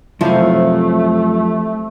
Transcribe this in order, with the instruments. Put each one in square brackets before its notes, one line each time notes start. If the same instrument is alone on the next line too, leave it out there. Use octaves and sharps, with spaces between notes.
[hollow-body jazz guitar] F#2 F3 [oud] C3 [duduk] A3 [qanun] E4 C#5 F5